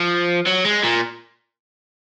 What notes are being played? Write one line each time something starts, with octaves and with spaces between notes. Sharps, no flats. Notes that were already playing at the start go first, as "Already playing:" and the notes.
Already playing: F3
F#3
G#3
A#2